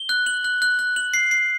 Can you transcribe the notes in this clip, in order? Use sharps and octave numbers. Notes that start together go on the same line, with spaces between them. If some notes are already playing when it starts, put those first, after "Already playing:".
Already playing: G7
F#6
F#7
F#6
F#6
F#6
F#7
C7
C7